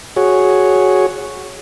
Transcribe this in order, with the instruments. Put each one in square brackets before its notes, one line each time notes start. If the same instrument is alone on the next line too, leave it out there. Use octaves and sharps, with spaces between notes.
[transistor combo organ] F#4 G#4 C#5